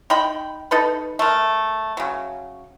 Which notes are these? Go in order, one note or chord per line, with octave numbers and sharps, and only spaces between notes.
D#4 G5 B5
D#4 A4 B4
A3 A#4
C#3 F#3